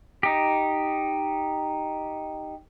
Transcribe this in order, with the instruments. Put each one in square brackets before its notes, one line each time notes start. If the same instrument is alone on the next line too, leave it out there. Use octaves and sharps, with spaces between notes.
[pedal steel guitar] D#4 G4